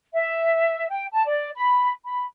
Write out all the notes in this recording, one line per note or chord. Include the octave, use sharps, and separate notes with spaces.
E5
G5
A5
D5
B5
B5